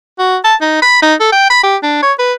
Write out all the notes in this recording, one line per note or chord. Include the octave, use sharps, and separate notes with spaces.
F#4
A5
D#4
B5
D#4
A4
G5
B5
G4
D4
C#5
B4